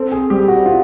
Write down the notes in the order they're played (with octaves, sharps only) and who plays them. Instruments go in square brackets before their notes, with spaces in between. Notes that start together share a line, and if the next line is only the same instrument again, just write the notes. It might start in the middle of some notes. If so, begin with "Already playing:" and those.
Already playing: [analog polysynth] C4 [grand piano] A4
[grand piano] G#4
[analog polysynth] G3 [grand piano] G4
[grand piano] F#4
F4